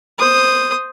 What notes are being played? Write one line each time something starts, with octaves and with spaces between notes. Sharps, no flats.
C5 D#6